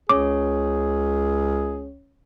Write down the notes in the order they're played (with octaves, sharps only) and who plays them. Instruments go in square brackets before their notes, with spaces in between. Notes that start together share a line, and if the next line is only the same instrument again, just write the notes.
[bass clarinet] C#2 [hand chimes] C#4 C#5 [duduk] G#4 [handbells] D6